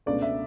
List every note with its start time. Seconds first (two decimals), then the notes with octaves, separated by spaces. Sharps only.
0.06 C#2 B2 A3 D4 D5
0.22 E5